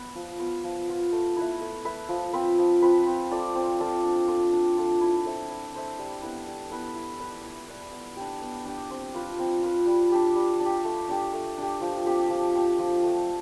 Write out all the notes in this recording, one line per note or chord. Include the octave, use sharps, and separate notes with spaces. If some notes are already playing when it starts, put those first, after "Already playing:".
Already playing: B3 B4
F3
B3 F4
F3
B3 F4
A3
E4 B4 E5
A3
E4 B4 E5
F3
C4 F4 B4
F3
C4 F4 B4
C4
F4 A4 D5
C4
F4 A4 D5
D4
F4 A4
D4
F4 A4
E4
A4 C5 E5
E4
A4 C5 E5
G3
B3 E4 B4
G3
B3 E4 B4
E4
B4 D5
E4
B4 D5
B3
D4 G4
B3
D4 G4
C4
F4 B4
C4
F4 B4
G3
D4 G4
G3
D4
G4
A3
D4 G4
A3
D4 G4
F3
C4 G4
F3
C4 G4
F3
A3 D4 A4